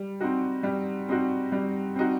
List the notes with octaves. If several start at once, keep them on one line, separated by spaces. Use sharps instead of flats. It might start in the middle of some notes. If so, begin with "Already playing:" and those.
Already playing: G3
C4 D#4 F#4
G3
C4 D#4 F#4
G3
C4 D#4 F#4